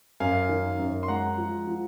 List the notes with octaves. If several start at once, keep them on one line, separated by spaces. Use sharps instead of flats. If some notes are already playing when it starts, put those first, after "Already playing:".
F#2 F5 G#5
D#3
F#2
C6
G#3 F#5 A#5
F3
F3